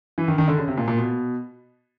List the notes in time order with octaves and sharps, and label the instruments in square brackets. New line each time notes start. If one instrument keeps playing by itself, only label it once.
[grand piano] E3
D#3
D#3
D3
C#3
C3
A#2
A#2
B2